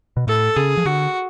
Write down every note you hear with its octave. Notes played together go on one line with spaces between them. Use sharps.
B2
A2 A4
C#3 G#4
F3
D3 F#4